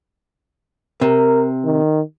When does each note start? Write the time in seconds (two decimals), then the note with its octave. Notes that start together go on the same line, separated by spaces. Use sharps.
1.01 C3 A#4
1.65 D#3